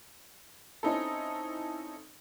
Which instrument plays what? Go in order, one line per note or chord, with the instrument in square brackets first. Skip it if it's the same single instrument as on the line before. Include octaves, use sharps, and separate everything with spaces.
[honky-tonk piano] C4 C#4 D#4 E4 A4